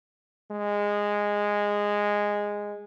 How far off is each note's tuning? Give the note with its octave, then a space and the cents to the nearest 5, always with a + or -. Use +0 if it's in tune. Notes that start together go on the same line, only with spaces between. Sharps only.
G#3 -10